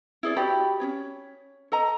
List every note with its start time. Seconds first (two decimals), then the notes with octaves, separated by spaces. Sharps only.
0.23 E4 G#4 D5
0.36 F#4 G4 D5 B5
0.80 C#4 D4 C#5
1.72 A4 D#5 A#5